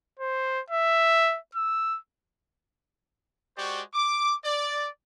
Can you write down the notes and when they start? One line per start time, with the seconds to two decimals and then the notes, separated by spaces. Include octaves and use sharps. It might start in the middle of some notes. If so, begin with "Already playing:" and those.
0.19 C5
0.70 E5
1.55 E6
3.57 G#3 F#4 G4 C5 D5 C#6
3.94 D6
4.45 D5